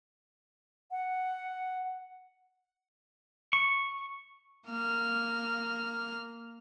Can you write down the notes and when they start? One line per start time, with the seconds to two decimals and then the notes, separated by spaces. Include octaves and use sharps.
0.91 F#5
3.53 C#6
4.68 A#3 F6